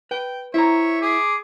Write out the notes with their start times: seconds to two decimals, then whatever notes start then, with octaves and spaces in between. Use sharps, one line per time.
0.11 B4 G5
0.54 E4 C5 C#5 E5 A#5
1.01 G#4 D6